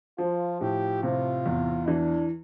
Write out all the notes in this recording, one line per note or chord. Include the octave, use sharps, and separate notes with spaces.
F3 F4
A2 G4
C3 F4
E2
E3 D4